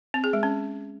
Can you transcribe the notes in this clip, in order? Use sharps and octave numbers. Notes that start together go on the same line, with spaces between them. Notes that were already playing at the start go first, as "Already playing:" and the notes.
C4
G#4
G#3
C#4